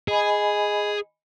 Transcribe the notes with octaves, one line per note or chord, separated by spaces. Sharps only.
G#4 D#5 G#5 B5